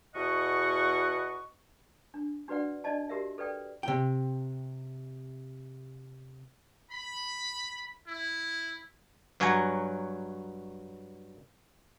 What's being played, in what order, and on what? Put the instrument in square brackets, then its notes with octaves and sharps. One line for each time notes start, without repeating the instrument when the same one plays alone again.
[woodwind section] E2 B2 D#5 F#5 C#6
[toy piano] D4
D4 F#4 B4 D5 F#5
D4 D#4 D5 D#5 A5
F#4 G4 A#4 E5
A4 B4 D5 G5
[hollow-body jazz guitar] C3 G5
[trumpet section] B5
E4
[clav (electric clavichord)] G2 F#3 C#5 F#5 G#5 A#5